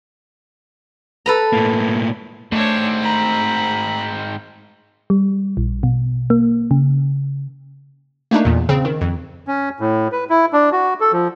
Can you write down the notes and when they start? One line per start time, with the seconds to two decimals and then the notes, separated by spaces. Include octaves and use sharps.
1.26 A4 B4 A#5
1.53 A2 A#3
2.52 G#2 A3 C4 D4 C#5
3.02 A#5 B5
5.10 G3
5.57 A#1
5.83 B2
6.30 A#3
6.71 C#3
8.31 A3 A#3 D4 D#4
8.45 E2 A#2
8.69 C#3 C4
8.85 D#3
9.01 F2
9.48 C#4
9.80 A2
10.12 B4
10.29 E4
10.53 D4
10.72 F#4
11.00 A4
11.12 F3